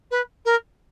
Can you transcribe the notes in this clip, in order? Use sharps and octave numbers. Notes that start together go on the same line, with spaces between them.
B4
A#4